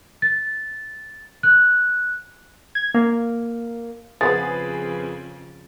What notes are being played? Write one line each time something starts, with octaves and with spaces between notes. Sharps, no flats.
A6
F#6
G#6
A#3
F2 C#3 F3 A3 B3 G#4 B4 A6